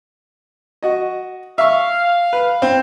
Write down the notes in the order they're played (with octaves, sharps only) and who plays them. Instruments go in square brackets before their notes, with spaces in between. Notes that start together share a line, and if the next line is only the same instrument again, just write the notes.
[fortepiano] F#4 D#5
[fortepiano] E5 C#6 [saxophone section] F5
[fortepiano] B4
[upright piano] C4